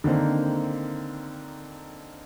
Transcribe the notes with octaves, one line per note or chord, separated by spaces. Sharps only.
D3 D#3 A#3 C4